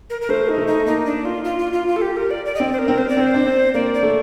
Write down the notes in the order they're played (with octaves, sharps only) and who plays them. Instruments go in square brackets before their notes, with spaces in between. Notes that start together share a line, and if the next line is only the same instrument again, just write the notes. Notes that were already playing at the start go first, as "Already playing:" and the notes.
[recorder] A#4
A#4
[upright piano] A3 [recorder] C5
[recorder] D#4
[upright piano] A3
[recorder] D#4
[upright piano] A#3 [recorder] D#4
[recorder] D4
F4
F4
F4
F4
F4
A4
G4
A#4
D5
D5
D#5
[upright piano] C4 [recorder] D5
[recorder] C5
A#4
[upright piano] C4
[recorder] C5
D5
[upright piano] C4 [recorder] C5
[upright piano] D4
C4
[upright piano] A#3 [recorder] D5
[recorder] D5
[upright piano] A3